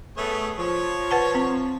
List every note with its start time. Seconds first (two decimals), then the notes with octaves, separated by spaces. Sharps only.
0.17 A3 B3 G#4 C#5
0.58 F3 C#5
1.11 B4 F#5 A5
1.35 C4